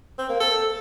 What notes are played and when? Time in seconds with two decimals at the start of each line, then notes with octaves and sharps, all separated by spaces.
0.18 C4
0.29 A#3
0.40 A4